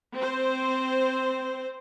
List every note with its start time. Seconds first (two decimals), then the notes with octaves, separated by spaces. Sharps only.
0.16 C4 C5